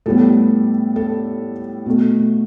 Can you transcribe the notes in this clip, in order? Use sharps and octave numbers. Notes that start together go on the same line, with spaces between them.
A2 G3 B3 A4
A4
B2 A3